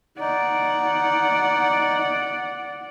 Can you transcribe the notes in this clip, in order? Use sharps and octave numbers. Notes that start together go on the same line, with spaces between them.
D#4 D5 F#5